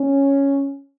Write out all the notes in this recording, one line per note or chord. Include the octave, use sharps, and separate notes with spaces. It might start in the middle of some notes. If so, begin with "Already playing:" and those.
Already playing: C#4